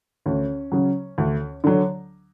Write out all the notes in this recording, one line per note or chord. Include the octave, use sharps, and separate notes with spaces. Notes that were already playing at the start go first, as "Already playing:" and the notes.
D2 C#4
C#3 F#3
D2
D3 F#3